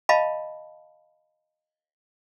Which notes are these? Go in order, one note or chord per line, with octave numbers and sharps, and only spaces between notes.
D#5 F5 A5 B5